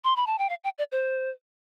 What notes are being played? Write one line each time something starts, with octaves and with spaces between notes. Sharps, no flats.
C6
B5
A5
G5
F5
G5
D5
C5